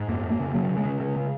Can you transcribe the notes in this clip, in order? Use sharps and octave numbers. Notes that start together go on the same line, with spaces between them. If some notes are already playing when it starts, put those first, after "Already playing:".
Already playing: G#2
F2 A#3
F2
A#3
C#3
C#3 F#3
C#3
G#3
C#3
C#3 G#3
C#3